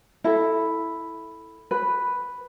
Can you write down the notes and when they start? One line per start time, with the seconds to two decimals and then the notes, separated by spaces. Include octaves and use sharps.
0.24 E4 A4
1.71 B4